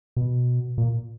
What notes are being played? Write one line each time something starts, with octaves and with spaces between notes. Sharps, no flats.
B2
A#2